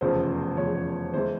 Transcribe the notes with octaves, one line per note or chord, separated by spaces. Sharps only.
F1 E2 C#3 F3 C5
F1 E2 C#3 F3 C#5
E2 E3 G#3 C5